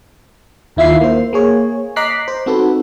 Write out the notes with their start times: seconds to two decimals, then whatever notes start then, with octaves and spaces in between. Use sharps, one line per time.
0.76 D#2 D#3 E4 F4 E5 C7
1.01 A#3 C5
1.33 A#3 G#4 C#5
1.96 D#5 A#5 D6 F#6 B6 C7
2.28 C5
2.46 C4 D#4 F#4 A4 B4